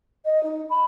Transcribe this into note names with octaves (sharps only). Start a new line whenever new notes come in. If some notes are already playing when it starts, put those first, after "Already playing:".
D#5
D#4
B5